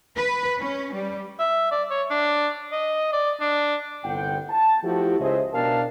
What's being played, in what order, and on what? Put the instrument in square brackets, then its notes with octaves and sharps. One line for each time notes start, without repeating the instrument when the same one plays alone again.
[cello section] B4
C#4
G3
[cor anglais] E5
D5
C#5
D4
D#5
D5
D4
[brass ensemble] G1 C2 D3 F#5 G5
A5
F3 A3 E4 F#4 G4
C#2 G#4 C5 D#5 E5
B2 D4 A#4 F5 G5 A5